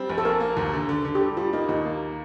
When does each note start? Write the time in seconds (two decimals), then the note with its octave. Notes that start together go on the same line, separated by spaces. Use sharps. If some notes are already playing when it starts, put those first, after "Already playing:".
Already playing: G3 C4
0.10 A#1
0.18 A4
0.25 A#3 A#4
0.40 A#3
0.57 D#2
0.74 D3
0.89 D3
1.05 D3
1.15 G4
1.21 G3 A4
1.37 G3 F4
1.53 A#3 D#4
1.69 D#2 D#4
1.85 A#3